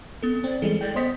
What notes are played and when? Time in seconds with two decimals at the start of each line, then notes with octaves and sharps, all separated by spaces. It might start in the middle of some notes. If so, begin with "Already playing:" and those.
0.23 B3 C4 A4
0.44 C4 D5
0.62 E3 G3 G#3 A4
0.81 D5 G5
0.96 B3 C5 D#5 B6